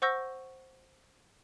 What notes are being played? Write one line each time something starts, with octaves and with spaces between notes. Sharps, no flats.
C5 F#5 C#6 E6 G6 A#6